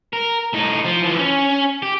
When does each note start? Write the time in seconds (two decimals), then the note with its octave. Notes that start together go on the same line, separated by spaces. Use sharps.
0.13 A#4
0.53 A2 D#4
0.85 F3 F4
1.03 E3 F3
1.19 C#4
1.82 G4